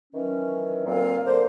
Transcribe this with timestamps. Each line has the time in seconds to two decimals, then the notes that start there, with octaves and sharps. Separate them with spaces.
0.13 D#3 E3 F#3 C#4
0.86 D2 A#2 F#3 C4 F5
1.25 D3 A#3 C5